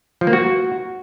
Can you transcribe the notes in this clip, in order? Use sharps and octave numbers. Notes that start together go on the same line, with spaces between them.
F3
A#3
F#4